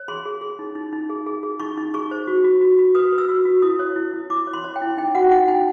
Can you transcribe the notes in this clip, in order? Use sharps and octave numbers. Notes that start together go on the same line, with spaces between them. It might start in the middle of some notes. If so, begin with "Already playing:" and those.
Already playing: C#5
G#4 C6
G#4
G#4
D#4
D#4
D#4
G#4
G#4
G#4
D#4 C#6
D#4
G#4 C#6
C5
F#4
F#4
F#4
F#4
B4 D#6
B4
E6
F#4
F#4
E4 D#6
C#5
E4
E4
E4 D6
C#5
C6
C#5
G5
E4
D#4 G5
F#4 F#5
D#4 F#5
D#4 G5